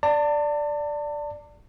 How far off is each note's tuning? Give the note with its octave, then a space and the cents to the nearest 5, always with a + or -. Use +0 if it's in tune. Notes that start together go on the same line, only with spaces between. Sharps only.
D5 +0 A5 +35